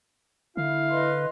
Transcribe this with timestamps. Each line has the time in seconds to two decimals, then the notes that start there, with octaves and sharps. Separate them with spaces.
0.57 D3 E4 F5
0.91 B4 D#5 C6